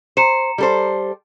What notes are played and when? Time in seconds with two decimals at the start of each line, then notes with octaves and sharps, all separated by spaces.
0.17 C5 A#5 C#7 E7
0.58 G3 A4 C5